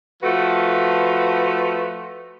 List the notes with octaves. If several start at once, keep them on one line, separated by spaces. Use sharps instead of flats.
F3 A3 F#4 B4